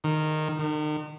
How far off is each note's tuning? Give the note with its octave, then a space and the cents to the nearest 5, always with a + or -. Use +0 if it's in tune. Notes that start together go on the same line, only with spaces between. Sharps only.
D#3 -10
D#3 -40